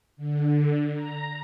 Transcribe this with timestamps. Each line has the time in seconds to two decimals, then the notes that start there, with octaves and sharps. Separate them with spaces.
0.17 D3
0.94 A#5